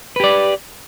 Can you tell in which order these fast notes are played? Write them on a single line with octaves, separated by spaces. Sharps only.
B4 G4 D5